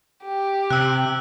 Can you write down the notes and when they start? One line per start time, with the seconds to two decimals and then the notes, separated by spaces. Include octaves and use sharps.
0.24 G4
0.70 C3 E6 F#6